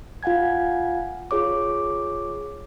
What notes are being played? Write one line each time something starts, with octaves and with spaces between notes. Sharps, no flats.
F4 F5 F#5 G#5 G#6
F4 G#4 C#5 D6